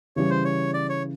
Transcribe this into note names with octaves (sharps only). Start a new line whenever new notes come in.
C#3 E3 G3 C#5
C5
C#5
D5
C#5